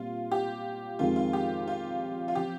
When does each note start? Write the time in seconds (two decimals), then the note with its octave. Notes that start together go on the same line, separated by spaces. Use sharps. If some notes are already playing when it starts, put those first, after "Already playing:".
Already playing: A#2 G3 C4 F4 G4
0.31 G4
0.99 F2 D#3 G#3 C4 F4
1.16 F4
1.33 G4
1.68 F4
2.28 F4
2.35 F3 C4 G4